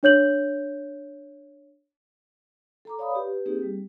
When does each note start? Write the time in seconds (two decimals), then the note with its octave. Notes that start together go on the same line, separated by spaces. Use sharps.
0.03 D4 C#5 G6 F#7
2.85 A4 A#5 D6
2.98 C#5 D5 F5 B5 D#6
3.11 G4 B4
3.46 A#3 C4 D#4 G4 G#4
3.62 G3